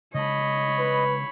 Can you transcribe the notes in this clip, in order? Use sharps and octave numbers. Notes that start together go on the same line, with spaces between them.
C#3 G#3 C#5 D#5 A5 B5
B4